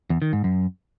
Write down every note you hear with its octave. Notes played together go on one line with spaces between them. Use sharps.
E2
D#3
G#2
F#2